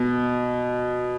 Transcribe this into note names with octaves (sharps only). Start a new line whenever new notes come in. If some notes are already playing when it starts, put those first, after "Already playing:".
Already playing: B2